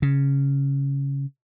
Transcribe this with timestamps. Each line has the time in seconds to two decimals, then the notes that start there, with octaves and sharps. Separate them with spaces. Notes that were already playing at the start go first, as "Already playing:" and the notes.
0.02 C#3